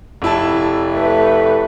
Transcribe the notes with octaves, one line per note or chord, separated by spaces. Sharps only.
F1 E4 A5
A3 B4